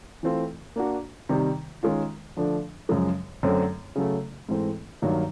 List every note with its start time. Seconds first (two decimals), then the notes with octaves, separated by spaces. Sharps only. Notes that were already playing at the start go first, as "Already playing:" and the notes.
0.23 E3 A3 C4 F4
0.76 A#3 D4 F#4
1.29 C3 D#3 G3
1.83 D#3 G#3 C#4 F4
2.37 D3 F3 A3 D4
2.89 F#2 C#3 F3 G#3
3.43 F#2 D3 F#3 A3 C4
3.96 C#3 F#3 A3
4.49 G#2 E3 A3 C4
5.02 G2 D#3 F#3 A#3